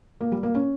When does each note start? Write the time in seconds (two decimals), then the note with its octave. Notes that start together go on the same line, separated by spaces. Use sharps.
0.21 A#3
0.32 G3
0.43 A#3
0.55 C#4